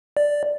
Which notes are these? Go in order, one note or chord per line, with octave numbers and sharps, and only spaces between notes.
D5